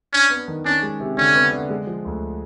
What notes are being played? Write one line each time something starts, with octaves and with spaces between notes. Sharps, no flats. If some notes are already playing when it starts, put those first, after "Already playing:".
C#4 D4
B3
D#3
C#4 D4
G#3
C3
D3 C#4
B3
D3
G#3
F3
D2